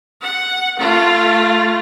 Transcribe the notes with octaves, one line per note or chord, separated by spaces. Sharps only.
F#5
A3 F4